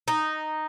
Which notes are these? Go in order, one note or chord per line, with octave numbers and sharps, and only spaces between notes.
D#4